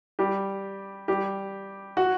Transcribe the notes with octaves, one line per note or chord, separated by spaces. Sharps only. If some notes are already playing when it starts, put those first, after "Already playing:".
G3 G4
G3 G4
F#4